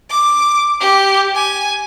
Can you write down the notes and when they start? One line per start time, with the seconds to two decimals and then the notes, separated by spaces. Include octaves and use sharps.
0.10 D6
0.80 G4
1.35 G#5